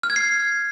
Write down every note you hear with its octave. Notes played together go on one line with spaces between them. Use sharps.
F6
G#6
C7